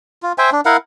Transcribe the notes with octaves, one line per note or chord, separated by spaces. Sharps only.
F4
C5 E5 G5 G#5
D4
E4 A#4 F5 F#5